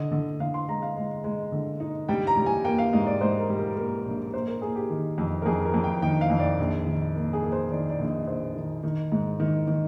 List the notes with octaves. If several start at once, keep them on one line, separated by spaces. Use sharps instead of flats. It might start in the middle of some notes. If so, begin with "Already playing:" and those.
Already playing: D3 D#5
D3
D3 F5
C6
G#3 A#5
F5
G#3
G#3
D3
D#4
G3 G5
A#5
G3
G#5
A#3 G5
F5
G#2 D#5
D5
G#2 C5
A#4
G3
A#4
A#3 A#4
A#1
A#3 C5
A#4
A#3 G#4
G4
D#3
F2
A#4
F2 G#4
A#4
F2
G5
D#3 G5
F5
F2
D5
A#1
D#3
A#3
G#4
A#3
C5
D#3 D5
D5
A#1
D#5
A#1 C5
D#3
D#3
G#2
D#3
D#3